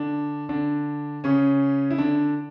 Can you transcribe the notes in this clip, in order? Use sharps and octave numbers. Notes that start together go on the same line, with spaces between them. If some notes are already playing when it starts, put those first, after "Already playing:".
Already playing: D3 D4
D3 D4
C#3 C#4
E4
D3 D4